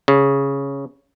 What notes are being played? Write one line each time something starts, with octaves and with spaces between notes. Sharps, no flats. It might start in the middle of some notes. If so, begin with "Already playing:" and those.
C#3